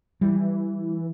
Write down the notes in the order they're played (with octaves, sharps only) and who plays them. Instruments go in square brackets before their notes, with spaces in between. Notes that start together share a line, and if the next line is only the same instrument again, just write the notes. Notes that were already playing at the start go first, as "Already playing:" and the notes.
[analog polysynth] E3 [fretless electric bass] G3